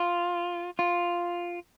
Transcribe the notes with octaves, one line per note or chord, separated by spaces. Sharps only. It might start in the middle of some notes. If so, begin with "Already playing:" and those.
Already playing: F4
F4